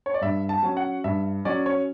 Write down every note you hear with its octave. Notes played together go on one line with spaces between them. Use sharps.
C#5
D5
G2 E5
A5
F#3 C#4
F#5
G2 E5
F#3 C#4 D5
C#5